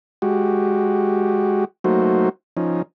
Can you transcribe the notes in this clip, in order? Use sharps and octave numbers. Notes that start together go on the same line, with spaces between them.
G#3 F#4 G4
F#3 A3 A#3 D#4 F#4 C5
F3 C#4 D#4